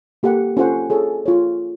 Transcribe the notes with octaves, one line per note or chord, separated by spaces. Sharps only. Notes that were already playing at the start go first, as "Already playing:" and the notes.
A#3 G4 A4 F#5
C#4 F4 A4 C5 F#5
G#4 A4 C#5
F4 C#5